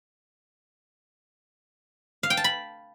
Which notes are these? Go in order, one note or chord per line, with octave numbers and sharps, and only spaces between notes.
F5
G5
A5
B5